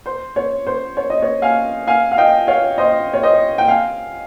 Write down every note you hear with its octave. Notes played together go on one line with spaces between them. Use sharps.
C5
C#5
C5
C#5
D#5
C#5
F5 G#5
F5 G#5
F5
D#5 G5
C#5 F5
C5 D#5
C#5
C5 D#5
G5
F5 G#5